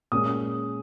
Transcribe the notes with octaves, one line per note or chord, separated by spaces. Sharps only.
A#2 G#3 C#4 D#6